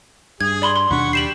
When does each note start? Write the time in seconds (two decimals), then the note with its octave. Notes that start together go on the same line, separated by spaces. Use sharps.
0.41 G2 G#4 G#6
0.62 D5 B5 C6
0.76 C6
0.90 D#2 B2 D4 F#5 B5 C#6
1.13 G3 G5 C7 E7 F#7